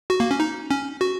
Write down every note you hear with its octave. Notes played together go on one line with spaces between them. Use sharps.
F#4
A#3
C#4
D#4
C#4
F#4